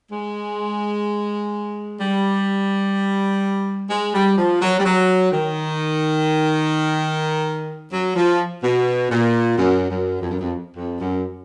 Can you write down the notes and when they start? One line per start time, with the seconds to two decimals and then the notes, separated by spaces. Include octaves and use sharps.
0.12 G#3
2.01 G3
3.90 G#3
4.14 G3
4.37 F3
4.61 F#3
4.79 G3
4.85 F#3
5.32 D#3
7.92 F#3
8.16 F3
8.63 B2
9.10 A#2
9.58 F#2
9.90 F#2
10.21 F2
10.31 F#2
10.40 F2
10.77 F2
11.00 F#2